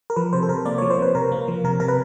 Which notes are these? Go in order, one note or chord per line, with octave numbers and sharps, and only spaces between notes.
A#4
F3 B4
C3 C5
A4
C3 A#4
A#3 D5
F3 C#5
C5
C3 B4
C3 A#4
A#3
F3
C3 A#4
C3 A#4
B4